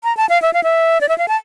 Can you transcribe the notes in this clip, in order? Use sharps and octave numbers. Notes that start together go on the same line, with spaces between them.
A#5
A5
F5
E5
F5
E5
D5
E5
F5
A5